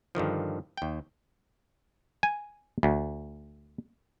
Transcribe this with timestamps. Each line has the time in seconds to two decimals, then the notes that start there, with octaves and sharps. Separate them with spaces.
0.15 G2 D3 D#3 F3
0.77 D#2 G5
2.23 G#5
2.83 D2